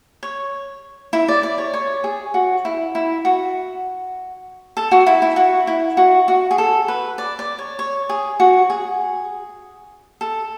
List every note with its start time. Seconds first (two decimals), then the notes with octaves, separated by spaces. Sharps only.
0.23 C#5
1.13 E4 E5
1.28 D5
1.43 D5
1.58 C#5
1.74 C#5
2.04 G#4
2.34 F#4
2.65 E4
2.95 E4
3.25 F#4
4.77 A4
4.91 F#4
5.07 E4
5.22 E4
5.36 F#4
5.67 E4
5.97 F#4
6.28 F#4
6.51 G#4
6.58 A4
6.88 B4
7.18 D5
7.39 D5
7.59 C#5
7.79 C#5
8.09 G#4
8.40 F#4
8.70 G#4
10.21 A4